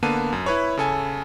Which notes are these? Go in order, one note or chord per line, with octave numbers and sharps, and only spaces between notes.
D3 A#3 B3 A5 D#7
F#2
E4 B4 C#5
C#3 A4 G#5